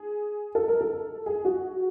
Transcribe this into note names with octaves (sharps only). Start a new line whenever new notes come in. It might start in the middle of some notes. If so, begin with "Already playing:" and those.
Already playing: G#4
A4
A#4
A4
G#4
F#4